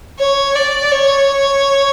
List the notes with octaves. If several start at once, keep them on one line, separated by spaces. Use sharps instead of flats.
C#5
D5
C#5